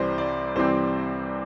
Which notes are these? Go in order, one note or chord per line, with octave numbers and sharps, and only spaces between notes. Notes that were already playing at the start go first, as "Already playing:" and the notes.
Already playing: C2 C3 E3 G3 C4 C5
D5
C2 C3 E3 G3 C4 C5